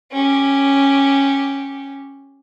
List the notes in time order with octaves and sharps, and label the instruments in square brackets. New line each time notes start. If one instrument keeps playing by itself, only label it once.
[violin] C#4 G4